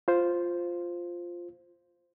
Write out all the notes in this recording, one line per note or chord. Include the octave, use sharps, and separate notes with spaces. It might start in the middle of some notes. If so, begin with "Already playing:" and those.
F4 C5